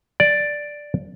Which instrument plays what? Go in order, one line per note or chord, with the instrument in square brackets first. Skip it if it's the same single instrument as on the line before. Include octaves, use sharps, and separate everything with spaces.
[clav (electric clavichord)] D5